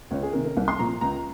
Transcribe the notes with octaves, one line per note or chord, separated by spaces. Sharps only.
C#2 C#5
G#4
C3 D#3 A#3 C#4 A#4
A#4
C2
C6
A#2 F3 A#3 A#5
C#2 A#5